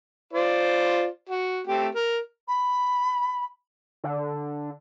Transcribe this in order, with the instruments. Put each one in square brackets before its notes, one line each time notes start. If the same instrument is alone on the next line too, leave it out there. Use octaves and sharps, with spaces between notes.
[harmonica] F4 C5 D5
F#4
A3 C4 G4
A#4
[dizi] B5
[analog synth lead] D3